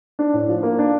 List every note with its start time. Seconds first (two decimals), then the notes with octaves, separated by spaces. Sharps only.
0.19 D4
0.34 A2
0.49 F3
0.63 A#3
0.79 D4